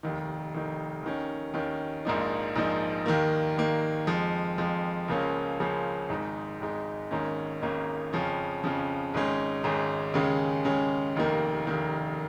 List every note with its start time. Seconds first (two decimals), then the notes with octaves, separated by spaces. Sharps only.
0.03 F1 D#2 D#3
0.54 F1 D#2 D#3
1.03 D#2 D#3 C#4
1.54 D#2 D#3 C#4
2.05 A#1 G#2 F3 A#3 D#4
2.56 A#1 G#2 F3 A#3 D#4
3.06 D#2 D#3 A#3
3.57 D#2 D#3 A#3
4.07 F2 F3 G#3
4.58 F2 F3 G#3
5.08 C#2 C#3 F3 A#3 C#4
5.60 C#2 C#3 F3 A#3 C#4
6.09 G#1 G#2 G#3 D#4
6.60 G#1 G#2 G#3 D#4
7.11 G#1 G#2 D#3 A#3 C#4
7.62 G#1 G#2 D#3 A#3 C#4
8.13 F2 C#3 F3 C#4
8.63 F2 C#3 F3 C#4
9.14 G#1 G#2 G#3 C#4
9.64 G#1 G#2 G#3 C#4
10.14 D#2 C#3 G#3 C#4
10.65 D#2 C#3 G#3 C#4
11.16 F1 D#2 D#3 A#3
11.67 F1 D#2 D#3 A#3